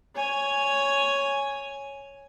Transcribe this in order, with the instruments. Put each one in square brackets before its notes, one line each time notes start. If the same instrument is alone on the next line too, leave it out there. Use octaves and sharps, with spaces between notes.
[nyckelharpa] C#5 G#5